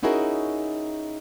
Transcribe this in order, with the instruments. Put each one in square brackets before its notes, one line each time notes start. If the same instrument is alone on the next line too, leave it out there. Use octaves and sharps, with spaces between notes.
[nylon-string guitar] C#4 D#4 E4 F#4 G#4 A#4